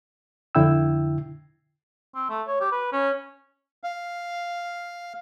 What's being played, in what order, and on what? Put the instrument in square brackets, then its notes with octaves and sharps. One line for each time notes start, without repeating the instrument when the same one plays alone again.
[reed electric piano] F2 D3 E4 G5 E6
[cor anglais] C4
A3
C#5
G4
B4
C#4
[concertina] F5